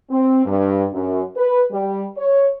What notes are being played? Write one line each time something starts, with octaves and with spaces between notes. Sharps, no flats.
C4
G2
F#2
B4
G3
C#5